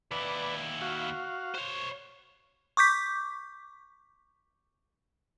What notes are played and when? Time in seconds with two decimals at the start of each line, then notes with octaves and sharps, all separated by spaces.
0.11 D#2 E4 B4 D5
0.82 F#4 F5
1.55 C5 C#5
2.77 C#6 D6 G6 B6